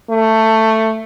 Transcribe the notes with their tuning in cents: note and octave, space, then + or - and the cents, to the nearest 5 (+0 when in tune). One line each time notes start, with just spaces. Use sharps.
A3 +10